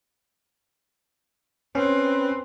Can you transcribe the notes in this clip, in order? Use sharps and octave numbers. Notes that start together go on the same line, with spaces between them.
C4 C#4 B4